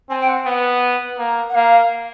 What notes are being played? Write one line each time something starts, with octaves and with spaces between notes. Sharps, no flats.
C4 G#5
G5
F#5
B3 F#5
A#3
F#5
A#3 F5